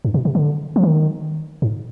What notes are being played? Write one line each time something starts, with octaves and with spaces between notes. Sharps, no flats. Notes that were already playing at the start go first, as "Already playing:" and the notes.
G2
B2
C3
D3
F3
D#3
G#2